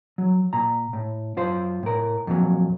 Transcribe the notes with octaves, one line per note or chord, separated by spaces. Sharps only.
F#3
A#2 A#5
A2
F#2 F4 C5
A2 A#4
F2 A#2 D#3 F#3